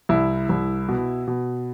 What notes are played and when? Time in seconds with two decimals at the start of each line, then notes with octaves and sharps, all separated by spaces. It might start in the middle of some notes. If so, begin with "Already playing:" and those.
0.09 C2 E4
0.49 C2
0.88 B2
1.27 B2